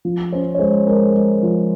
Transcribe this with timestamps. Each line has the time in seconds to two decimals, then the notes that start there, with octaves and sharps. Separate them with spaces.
0.05 F3
0.32 C#4 C5
0.54 C#5
0.59 G#3 C5
0.87 G#3 A#4
1.15 G#3
1.43 F3